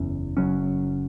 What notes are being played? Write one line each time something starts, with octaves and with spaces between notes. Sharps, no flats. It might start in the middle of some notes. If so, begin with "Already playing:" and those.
Already playing: F#1 E2 E3 C#4
F#1 F#2 F#3 C#4